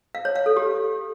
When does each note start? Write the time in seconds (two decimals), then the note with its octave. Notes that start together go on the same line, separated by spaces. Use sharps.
0.15 F5
0.25 C#5
0.36 F5
0.46 A4
0.56 G4